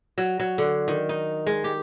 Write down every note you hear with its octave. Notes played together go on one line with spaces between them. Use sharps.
F#3
F#3
D3
D#3
D#4
G#3
G4